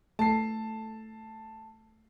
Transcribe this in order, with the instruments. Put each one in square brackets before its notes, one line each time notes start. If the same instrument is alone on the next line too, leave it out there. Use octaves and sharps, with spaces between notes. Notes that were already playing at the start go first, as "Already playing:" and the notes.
[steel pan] A3 [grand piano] A5 C7